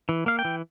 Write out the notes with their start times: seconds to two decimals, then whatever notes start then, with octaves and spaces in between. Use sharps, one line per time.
0.09 E3
0.26 A#3 F5
0.39 G5
0.45 E3